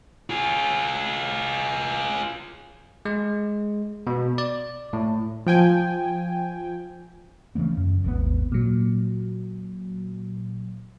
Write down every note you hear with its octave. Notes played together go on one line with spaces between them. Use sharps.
F4 G#4
G#3
B2
D5
A2
F3 G5 G#5
C#3 E3 A3 B3
F#2
G#1 D#2 D#3 B3
A#2 F#3